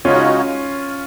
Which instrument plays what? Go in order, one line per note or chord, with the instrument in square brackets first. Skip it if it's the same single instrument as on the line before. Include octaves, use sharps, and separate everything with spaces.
[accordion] C#3 G#3 D#4 F#4 C#5 [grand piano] C#4 F4